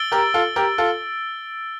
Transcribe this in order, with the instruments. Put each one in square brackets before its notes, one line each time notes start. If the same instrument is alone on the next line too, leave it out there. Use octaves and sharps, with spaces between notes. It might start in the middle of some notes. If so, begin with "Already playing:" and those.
Already playing: [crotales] E6 A6 D7 G7
[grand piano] G4 A#4
F4 A4
G4 A#4
F4 A4